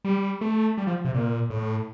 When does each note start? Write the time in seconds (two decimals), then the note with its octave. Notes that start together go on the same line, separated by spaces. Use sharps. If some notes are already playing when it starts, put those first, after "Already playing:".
0.05 G3
0.41 A3
0.77 G3
0.87 F3
1.05 C3
1.14 A#2
1.50 A2